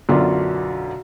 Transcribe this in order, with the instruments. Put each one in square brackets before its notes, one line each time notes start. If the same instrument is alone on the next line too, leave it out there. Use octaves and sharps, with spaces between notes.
[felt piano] B1 F#2 B2 D3 D4 F4